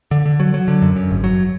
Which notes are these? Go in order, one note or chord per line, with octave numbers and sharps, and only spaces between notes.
D3
D3
F#3
F#3
D3
F#2
F#2
G#1
F#3